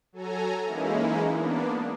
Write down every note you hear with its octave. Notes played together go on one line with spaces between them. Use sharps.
F#3 A4 G#5 A#5
E3 G#3 A#3 C#4 D#4 E4
A#3 B3 D4